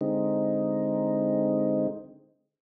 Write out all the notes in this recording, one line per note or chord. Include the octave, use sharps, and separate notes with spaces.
D3 G#3 C4 D#4